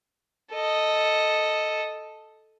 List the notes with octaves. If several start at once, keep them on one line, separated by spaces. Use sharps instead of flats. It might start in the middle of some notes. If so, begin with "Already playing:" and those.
A4 D#5